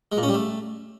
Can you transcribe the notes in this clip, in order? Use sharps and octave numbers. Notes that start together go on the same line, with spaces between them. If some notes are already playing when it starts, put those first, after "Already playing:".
G#3
A#2
C#4
G3
A3